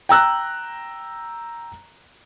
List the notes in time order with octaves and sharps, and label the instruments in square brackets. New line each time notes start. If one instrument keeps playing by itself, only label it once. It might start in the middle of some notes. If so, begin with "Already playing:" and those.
[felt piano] G5 A#5 E6 F#6